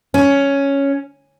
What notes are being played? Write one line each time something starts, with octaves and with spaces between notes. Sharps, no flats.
C#4